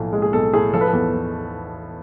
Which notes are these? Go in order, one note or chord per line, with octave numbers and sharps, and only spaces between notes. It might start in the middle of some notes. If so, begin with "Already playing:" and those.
Already playing: B1 A2 F3
G#3
G#4
B1 A4
A2 G#4
F3 A4
B4
A4
E2
E2